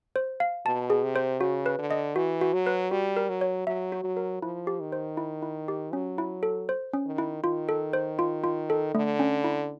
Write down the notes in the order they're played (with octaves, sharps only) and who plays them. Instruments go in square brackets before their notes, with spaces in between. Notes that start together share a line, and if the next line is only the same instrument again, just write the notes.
[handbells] C5
F5
[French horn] B2 [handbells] A5
[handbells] G#4
[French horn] C3
[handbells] C5
[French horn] C#3 [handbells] F#4
[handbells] B4
[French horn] D3
[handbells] D#5
[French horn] E3 [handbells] F#4
[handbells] F#4
[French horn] F#3
[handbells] B4
[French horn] G3 [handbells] F#4
[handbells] A#4
[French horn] F#3
[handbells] C#5
[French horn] F#3 [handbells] E5
[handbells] F#4
[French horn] F#3
[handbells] A#4
[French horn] F3 [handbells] E4
[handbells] G4
[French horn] D#3
[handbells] C5
E4
E4
G4
[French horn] F#3 [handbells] C#4
[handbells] E4
A4
C5
C#4
[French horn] D#3
[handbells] E4
[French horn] D#3 [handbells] F4
[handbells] A4
C5
F4
F4
A4
[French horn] D3 [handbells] A3
[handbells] C#4
E4